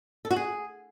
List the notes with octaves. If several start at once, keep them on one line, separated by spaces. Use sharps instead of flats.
A4
F#4
G#4